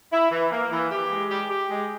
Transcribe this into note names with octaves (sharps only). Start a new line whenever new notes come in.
E4
E3
A#3
E3
G4
G#3
G4
G4
G#3